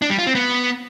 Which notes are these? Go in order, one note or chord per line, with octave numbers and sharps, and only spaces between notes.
D4
G3
F4
C4
B3